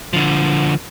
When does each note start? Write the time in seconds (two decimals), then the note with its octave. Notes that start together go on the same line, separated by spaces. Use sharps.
0.13 D3 F3